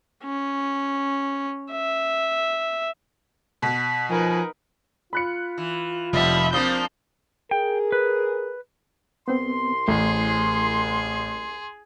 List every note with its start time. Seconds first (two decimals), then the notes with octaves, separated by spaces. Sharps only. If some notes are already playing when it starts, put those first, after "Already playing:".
0.24 C#4
1.72 E5
3.62 B2 B6
4.09 F3 D#4 A#4 B4 G#5
5.13 F4 B5 F#6 C#7
5.58 E3
6.13 F1 F3 G3 B3 E5
6.53 F3 A#3 C4 D4 D#6 G6 G7
7.51 G#4 A#4 G5
7.92 B4
9.28 C2 B3 C4 C6
9.88 A1 A3 G#4